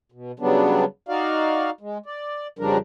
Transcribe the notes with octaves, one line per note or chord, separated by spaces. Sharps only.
B2
C#3 F#3 G3 B3 D4
D#4 F#4 D5 F5
G#3
D5
F2 C#3 F3 G3 D4 A#4